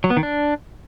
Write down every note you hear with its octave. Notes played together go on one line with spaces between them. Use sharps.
F#3
B3
D#3
D4